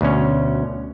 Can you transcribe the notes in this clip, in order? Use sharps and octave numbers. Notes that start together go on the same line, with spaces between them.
D2 B2 C#4